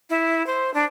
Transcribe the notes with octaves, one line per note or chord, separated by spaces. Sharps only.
E4
C5
D4